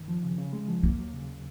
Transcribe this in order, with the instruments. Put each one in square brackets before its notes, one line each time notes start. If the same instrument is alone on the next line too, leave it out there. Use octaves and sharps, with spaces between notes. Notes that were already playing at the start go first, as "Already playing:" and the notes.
Already playing: [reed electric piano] F#2 D#3
F3
C#3
C#3
G#3
F3
[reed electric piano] D#2 [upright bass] A#3
[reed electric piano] F#3
C#3